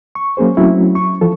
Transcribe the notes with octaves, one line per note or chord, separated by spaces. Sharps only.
C#6
F#3 A#3 C#4 G#4 C5
F#3 A3 C4 C#4 E4 F#4
C#6
E3 F3 A4